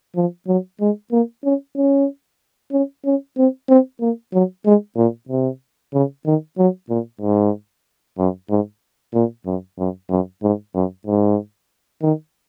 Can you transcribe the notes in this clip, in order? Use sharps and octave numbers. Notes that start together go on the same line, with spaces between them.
F3
F#3
G#3
A#3
C#4
C#4
C#4
C#4
C4
C4
A#3
F#3
G#3
A#2
C3
C#3
D#3
F#3
A#2
G#2
F#2
G#2
A#2
F#2
F#2
F#2
G#2
F#2
G#2
D#3